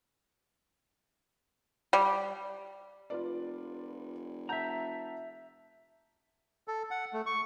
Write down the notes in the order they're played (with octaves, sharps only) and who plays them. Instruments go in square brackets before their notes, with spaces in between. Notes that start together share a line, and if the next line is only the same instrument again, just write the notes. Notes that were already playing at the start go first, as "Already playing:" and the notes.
[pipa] G3
[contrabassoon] F1 [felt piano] F4 B4 D5
[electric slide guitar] E5 A#5 [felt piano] F#5 A5 G6
[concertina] A4
F#5
A3
C#6